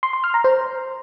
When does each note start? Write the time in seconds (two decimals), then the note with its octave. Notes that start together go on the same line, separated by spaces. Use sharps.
0.03 C6
0.13 C6
0.24 F6
0.34 A#5
0.44 C5